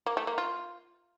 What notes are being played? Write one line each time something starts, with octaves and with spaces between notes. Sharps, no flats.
A#3
A3
A#3
F4